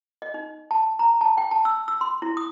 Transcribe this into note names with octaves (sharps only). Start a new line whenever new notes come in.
D#5
D#4
A5
A#5
A5
G5
A5
E6
E6
C6
E4
D#6